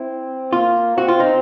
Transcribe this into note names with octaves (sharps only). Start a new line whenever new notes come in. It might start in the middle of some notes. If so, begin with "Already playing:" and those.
Already playing: C4 E4
A#3 F4
C4 F#4
F4
D#4